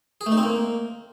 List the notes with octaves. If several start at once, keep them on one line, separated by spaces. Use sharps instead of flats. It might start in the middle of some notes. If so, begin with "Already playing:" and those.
G#4
A3
D#4
C4
A#3